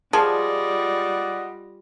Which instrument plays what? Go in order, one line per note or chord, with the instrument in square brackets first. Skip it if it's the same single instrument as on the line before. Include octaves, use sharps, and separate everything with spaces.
[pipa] F3 [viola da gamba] G3 F4 [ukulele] G#4 [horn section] D5 D#5 F#5